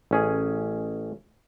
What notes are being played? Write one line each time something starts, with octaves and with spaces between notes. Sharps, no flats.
A1 C#4 G#4